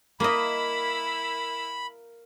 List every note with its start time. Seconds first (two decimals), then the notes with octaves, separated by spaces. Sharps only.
0.20 A#3 E4 A#4 D#5 F5 B5 E6